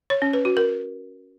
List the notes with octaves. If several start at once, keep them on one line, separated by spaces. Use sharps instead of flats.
C#5
C#4
B4
F#4
A#4